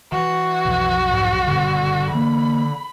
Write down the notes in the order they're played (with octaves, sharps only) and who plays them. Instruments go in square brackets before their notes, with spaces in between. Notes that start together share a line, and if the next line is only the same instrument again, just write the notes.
[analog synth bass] E3 [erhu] F#4
[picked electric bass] B1 F2
[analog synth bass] G#2
[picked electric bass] F#1 G2 B2 [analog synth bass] D3
[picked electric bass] E3 A#3 [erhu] B5